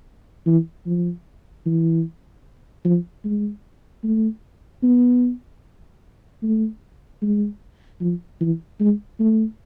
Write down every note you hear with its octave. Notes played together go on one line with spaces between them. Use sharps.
E3
F3
E3
F3
G#3
A3
B3
A3
G#3
F3
E3
G#3
A3